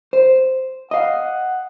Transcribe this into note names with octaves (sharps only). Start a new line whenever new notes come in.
C5
D#5 F5 F#5